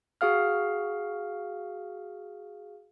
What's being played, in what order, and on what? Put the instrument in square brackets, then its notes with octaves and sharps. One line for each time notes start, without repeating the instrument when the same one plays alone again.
[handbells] F#4 G#4 F5 F6